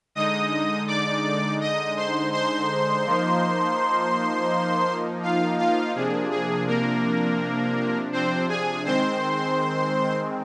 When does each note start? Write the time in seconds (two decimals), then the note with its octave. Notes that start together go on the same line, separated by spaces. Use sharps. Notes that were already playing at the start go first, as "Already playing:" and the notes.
0.15 D3 G#3 D#4 D#5 D#6
0.87 D5 D6
1.61 D#5 D#6
1.97 C5 C6
2.33 C5 C6
3.05 F3 A#3 D#4
5.23 F4 F5
5.59 F4 F5
5.95 C3 F3 A#3 D4 G#4
6.31 G#4
6.67 A#3 A#4
8.12 C4 C5
8.49 G#4 G#5
8.85 D#3 G#3 C4 C5 C6